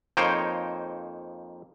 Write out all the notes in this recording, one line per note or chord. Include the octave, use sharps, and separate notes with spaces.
F2 A#3 D#4 C5 C#5 G5